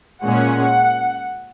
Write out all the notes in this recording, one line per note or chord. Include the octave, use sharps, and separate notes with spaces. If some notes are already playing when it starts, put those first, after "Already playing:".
A#2 G#3 C#4 F#5